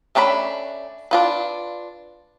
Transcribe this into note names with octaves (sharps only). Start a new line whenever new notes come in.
A3 C#4 D4 A#4 B5
D4 F4 B4